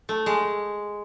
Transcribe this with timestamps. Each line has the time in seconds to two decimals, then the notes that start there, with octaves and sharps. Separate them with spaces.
0.09 A3
0.26 G#3